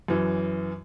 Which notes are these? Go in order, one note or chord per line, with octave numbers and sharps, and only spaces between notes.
F#2 E3